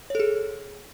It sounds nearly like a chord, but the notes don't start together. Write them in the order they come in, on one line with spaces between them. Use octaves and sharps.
C#5 A4 G#4